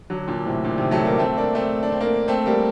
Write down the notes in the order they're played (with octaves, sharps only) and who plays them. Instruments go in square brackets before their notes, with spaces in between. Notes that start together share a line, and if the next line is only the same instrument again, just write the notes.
[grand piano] D3 F#3
A#2 D3
A2 C3
A#2 D3
C3 D#3
F#3 A3
G3 A#3
A3 C4
A#3 D4
A3 C4
D4
C4
A#3 D4
A3 C4
G3 A#3